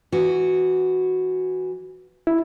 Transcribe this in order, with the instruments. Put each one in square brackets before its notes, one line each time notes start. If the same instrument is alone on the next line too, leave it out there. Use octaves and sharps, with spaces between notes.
[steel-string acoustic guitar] E3 F#4
[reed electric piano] E4